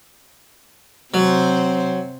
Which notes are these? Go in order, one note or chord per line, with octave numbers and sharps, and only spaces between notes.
C3 F#3 C4 C5